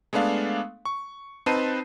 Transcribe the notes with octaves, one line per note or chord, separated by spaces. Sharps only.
G#3 A3 B3 D4 F5
C#6
C4 D#4 B4 A5 C7 D#7